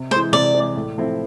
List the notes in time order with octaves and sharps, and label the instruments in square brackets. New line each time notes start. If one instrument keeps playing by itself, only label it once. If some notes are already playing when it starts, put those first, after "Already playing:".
Already playing: [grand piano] C3
[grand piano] G#3 [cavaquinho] C5
[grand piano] E3
[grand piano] C3 [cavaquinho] D5
[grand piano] E3 G#3
A2
F3 A3 C4 E4